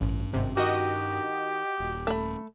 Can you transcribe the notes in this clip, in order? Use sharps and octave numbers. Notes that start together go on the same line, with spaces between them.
A1 G2 C#4
G#1 C3
D#3 F#4 G4 D#5
D#1
A3 B5